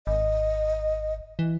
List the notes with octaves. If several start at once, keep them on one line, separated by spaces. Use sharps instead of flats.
G#1 D#5
E3